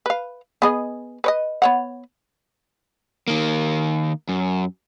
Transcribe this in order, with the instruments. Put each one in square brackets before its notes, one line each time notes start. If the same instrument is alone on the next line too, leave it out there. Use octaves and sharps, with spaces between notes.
[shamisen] B4 F5
B3 G#4 D#5
B4 C#5 D#5
B3 C#5 F#5
[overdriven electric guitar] D#3 A#3
F#2